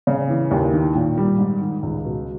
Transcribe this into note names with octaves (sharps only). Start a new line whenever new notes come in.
C#3
E3
D#2
D#3
A#2
G3
G#2
D#3
C#2
B2